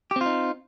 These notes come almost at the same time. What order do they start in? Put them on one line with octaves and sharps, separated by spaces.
G4 C4 F4 D#4